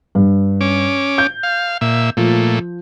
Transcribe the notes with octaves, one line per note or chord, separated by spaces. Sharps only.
G2
C#4 D6
G6
F5
A#2 E5
A#2 F3 A3